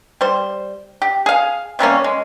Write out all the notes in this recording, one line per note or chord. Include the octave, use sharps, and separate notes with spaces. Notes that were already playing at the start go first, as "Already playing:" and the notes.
G3 C5
G4
G#4 F5
C3 G3 A#3 C#4
G#3